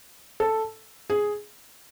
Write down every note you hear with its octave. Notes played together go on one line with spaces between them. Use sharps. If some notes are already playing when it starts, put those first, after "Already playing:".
A4
G#4